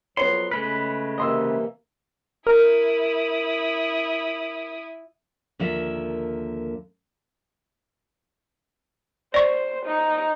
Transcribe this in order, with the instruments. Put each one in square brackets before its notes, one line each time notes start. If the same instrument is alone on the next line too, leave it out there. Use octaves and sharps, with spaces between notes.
[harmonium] F2 F#3 [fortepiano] B3 C#5 [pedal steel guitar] C6
[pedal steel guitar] C#3 G#3 B4 [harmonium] A3
[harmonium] C3 E3 A#3 [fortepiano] D#5 C6 E6
[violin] E4 D#6 [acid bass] A#4
[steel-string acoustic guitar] D#2 D3 F3 A#4 E5
[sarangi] C5 [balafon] D5 C#6
[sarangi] D#4